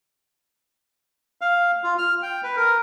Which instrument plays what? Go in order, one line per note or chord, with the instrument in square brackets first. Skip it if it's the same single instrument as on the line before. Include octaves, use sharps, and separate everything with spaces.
[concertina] F5
F4
F6
G5
B4
A#4